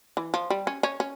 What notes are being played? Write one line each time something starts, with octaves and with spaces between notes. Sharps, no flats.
E3
F3
G3
C#4
C#4
C#4